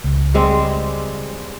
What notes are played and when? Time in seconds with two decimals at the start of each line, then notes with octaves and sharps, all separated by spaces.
0.04 C#2
0.34 G3 G#3 C4